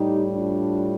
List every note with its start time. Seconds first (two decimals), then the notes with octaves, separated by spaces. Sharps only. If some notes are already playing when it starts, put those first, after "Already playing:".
Already playing: A2 G3 D#4 G4
0.33 D4 F4